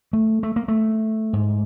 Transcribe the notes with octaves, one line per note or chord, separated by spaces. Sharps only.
A3
A3
A#3
A3
G#2